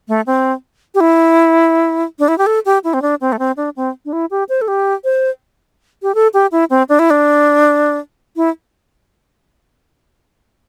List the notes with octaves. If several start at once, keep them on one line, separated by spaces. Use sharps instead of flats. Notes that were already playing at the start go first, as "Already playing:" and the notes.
A3
C4
G4
E4
D4
E4
G4
A4
G4
E4
C4
D4
C4
A3
C4
D4
C4
D4
E4
G4
C5
A4
G4
C5
G4
A4
G4
E4
C4
D4
E4
D4
E4